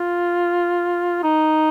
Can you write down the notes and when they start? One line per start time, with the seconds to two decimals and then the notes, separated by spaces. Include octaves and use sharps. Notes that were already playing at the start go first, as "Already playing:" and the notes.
Already playing: F4
1.23 D#4